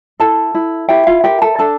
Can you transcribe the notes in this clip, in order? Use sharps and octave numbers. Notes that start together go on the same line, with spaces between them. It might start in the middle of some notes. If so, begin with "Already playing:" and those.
E4 A4 A5
E4
E4 G4 G5
F4 F5
G4 A#4 G5
A4 A5
D4 A4 A5